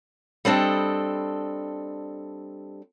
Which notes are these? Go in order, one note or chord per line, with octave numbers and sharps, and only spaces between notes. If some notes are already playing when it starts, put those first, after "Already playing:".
G3 C4 D4 A4 D#5